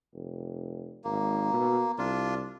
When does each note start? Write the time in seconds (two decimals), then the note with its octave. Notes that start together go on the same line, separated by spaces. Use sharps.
0.13 F1
1.04 G#1 A#3
1.53 B2
1.98 C2 D4 F4